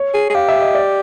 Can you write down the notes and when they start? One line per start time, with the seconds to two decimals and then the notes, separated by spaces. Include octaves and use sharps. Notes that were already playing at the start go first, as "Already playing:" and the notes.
Already playing: C#5
0.14 G#4
0.30 G#4
0.34 G4 F5
0.48 E5
0.61 D#5
0.75 D5